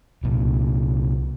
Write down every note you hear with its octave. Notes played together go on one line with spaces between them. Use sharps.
C2 A#2